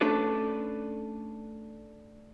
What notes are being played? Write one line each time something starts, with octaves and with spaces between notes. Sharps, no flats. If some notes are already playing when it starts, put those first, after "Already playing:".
A3 C#4 D4 A4 B4 D5